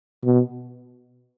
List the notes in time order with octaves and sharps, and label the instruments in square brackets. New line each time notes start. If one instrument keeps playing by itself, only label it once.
[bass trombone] B2